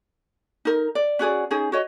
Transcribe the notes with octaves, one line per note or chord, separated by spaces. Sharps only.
D#4 A#4
D5
C#4 F#4 G#4 D5
C#4 D#4 G#4
F#4 C#5 D#5